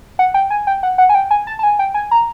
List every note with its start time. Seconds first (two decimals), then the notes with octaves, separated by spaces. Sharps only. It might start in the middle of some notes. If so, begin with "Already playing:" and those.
0.19 F#5
0.34 G5
0.50 G#5
0.67 G5
0.83 F#5
0.98 F#5
1.09 G#5
1.15 G5
1.31 G#5
1.47 A5
1.59 A5
1.63 G#5
1.79 G5
1.94 G#5
2.11 A#5